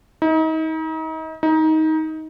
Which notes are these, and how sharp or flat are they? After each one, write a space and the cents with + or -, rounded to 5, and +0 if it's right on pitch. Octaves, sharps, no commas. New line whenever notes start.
D#4 +35
D#4 +20